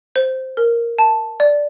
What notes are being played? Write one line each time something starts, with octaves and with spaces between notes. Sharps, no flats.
C5
A#4
A5
D5